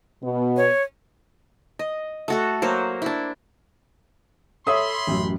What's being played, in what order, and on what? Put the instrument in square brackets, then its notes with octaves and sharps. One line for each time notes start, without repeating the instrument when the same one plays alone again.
[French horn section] B2 B3
[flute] C#5
[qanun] D#5
A3 F#4 A4
F#3 A#3 C5
D4 E4
[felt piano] A4 [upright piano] C#5 E5 D#6 [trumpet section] B5 C6
[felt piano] A1 F#2